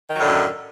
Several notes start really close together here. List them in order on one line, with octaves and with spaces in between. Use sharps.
D#3 F#3 A2 D3 F#2